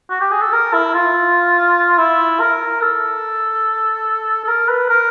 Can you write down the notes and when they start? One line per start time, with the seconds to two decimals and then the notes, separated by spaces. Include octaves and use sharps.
0.10 F#4
0.21 G4
0.31 G#4
0.42 A4
0.53 A#4
0.73 E4
0.94 F4
1.98 E4
2.40 A#4
2.81 A4
4.44 A4
4.48 A#4
4.69 B4
4.90 A#4